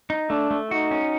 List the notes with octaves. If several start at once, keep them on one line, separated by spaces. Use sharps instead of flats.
D#4
A3 D4
A3
D#4 F#4
C#4